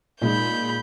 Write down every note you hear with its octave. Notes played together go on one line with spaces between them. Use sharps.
A#2 G#3 D#4 B5 G6